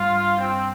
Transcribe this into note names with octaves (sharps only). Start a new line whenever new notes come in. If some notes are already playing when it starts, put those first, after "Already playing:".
Already playing: G2 F4
C4